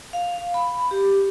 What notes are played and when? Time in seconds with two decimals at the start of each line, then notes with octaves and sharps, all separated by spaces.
0.13 F5
0.54 B5
0.91 G4